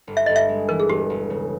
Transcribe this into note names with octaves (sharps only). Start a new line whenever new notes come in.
G1
E5
G1 D#5
E5
G#3
E3 A#4
G#4
E1 G4
E1
C#3